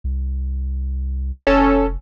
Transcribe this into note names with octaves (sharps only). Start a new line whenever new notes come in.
C2
F1 C#4 A4